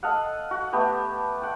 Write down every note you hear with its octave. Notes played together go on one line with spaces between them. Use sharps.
A4 D#5 F5 F#5
F#4
A3 B3 G4
F#5 G5